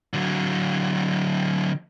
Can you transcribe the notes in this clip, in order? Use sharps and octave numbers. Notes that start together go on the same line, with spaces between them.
D3 F#3